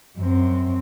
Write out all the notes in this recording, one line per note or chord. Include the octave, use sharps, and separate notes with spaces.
F#2 C4